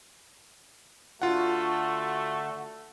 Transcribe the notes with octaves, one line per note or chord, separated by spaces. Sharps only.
D3 A3 F4 F#4 F#5